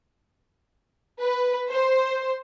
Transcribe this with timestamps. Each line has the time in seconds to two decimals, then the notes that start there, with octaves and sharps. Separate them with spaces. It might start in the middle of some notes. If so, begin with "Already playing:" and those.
1.22 B4
1.71 C5